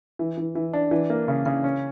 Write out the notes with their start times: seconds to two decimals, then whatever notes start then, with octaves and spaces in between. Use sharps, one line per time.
0.19 E3
0.38 E3
0.55 E3
0.73 D4
0.91 E3
1.10 A#3
1.28 C#3
1.46 C#3
1.64 C#4